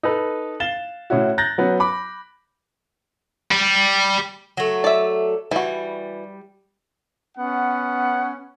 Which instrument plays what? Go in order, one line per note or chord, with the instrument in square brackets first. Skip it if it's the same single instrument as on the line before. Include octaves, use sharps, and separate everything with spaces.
[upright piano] D#4 A4 B4
F5 A6 E7 G7
A2 C#4 E4 F#4
A#5 F#6 G6 A6 A#6
F#3 B3 C#4
B5 D6
[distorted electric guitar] G3
[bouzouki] F#3 A3
[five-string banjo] D5 E5
[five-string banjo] E3 F#4 [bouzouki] G3
[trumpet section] B3 C#4 F#5